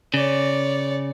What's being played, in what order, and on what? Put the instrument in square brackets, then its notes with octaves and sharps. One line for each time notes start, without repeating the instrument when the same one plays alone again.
[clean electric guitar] C#3 [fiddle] C#5 D5